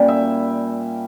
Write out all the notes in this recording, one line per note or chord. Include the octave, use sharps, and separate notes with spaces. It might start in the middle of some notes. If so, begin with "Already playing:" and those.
Already playing: A#2 G3 C#4 G5
E5